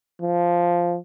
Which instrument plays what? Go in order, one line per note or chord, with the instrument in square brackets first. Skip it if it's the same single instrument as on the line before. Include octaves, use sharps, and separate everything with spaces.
[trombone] F3